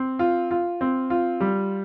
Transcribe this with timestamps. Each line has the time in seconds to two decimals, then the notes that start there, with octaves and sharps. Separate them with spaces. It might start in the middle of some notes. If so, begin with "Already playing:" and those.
Already playing: C4
0.19 F4
0.51 F4
0.81 C4
1.10 F4
1.40 G3